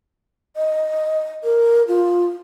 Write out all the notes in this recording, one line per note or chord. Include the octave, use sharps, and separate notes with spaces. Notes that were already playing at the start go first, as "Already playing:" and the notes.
D#5
A#4
F4